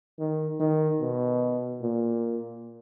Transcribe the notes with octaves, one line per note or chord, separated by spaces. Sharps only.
D#3
D#3
B2
A#2